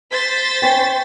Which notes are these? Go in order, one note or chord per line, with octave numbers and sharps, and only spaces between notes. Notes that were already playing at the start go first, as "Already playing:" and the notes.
C5 A6 B6
C#4 C#5 G5